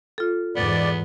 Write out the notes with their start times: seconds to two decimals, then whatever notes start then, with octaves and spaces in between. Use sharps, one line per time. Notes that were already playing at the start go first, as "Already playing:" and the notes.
0.18 F4 A4
0.56 E2 G#2 B3 D5